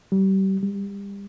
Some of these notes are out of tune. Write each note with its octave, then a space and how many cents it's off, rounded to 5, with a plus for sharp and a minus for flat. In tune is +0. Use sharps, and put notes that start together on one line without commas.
G3 -30
G3 +30